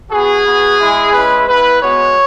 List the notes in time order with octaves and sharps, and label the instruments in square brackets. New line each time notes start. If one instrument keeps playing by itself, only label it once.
[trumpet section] B3 F#4 G#4
B3 F#4
G#3 E4
G#3 C#4 E4 B4
B3 E4 B4
G#3 B3 F#4 C#5